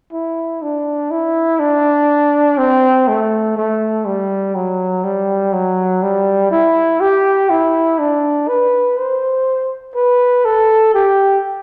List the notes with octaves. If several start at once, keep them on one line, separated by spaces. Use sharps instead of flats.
E4
D4
E4
D4
C4
A3
A3
G3
F#3
G3
F#3
G3
E4
G4
E4
D4
B4
C5
B4
A4
G4